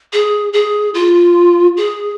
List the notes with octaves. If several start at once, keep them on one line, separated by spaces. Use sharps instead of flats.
G#4
G#4
F4
G#4